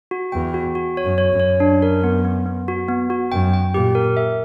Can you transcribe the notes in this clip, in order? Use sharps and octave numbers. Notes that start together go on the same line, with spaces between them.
F#4
E2 G5
F#4
F#4
C#5
F#2
C#5
F#2
C#5
D4
A#4
B3
B3
B3
F#4
B3
F#4
F#2 G5
G5
A#2 G4
A#4
E5